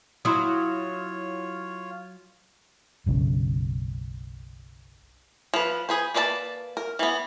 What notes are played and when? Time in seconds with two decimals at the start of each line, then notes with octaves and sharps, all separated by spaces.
0.25 F#3 E4 F4 C#5 C6 D#6
3.06 F#1 B1 C#3
5.54 F3 B4
5.89 G#4 B4 C5
6.15 A#3 B4 D5 D#5 A5
6.77 A#4
6.99 E3 B3